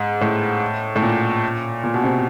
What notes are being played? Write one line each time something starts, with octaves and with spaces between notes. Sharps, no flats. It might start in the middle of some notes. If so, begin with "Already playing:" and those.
Already playing: G#2
A2
A2
A#2
A#2
B2
C3